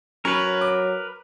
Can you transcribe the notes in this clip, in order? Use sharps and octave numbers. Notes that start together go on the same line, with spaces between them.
F#3 C#4 A#4 B4
D6